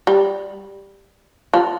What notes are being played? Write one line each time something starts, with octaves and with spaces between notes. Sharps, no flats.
G3
F3